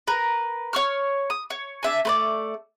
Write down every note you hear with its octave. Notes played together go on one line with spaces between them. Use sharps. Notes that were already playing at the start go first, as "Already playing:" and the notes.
A#4 B4
C#5 C#6 F6
D#6
C#5
D4 E5 G#5
A3 B4 D5